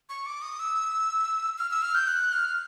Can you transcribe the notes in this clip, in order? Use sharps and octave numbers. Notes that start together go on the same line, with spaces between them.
C#6
D6
D#6
E6
F6
E6
F6
G6
F#6
F6